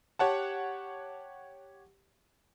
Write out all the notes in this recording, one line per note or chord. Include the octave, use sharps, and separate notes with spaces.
G4 C#5 F#5 A5